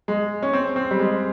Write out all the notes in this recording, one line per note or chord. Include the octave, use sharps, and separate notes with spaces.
G#3
C#4
C4
C4
G3
G#3